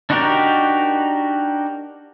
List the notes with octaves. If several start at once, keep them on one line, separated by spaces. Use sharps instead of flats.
D4 D#4 F#4 G4 A#4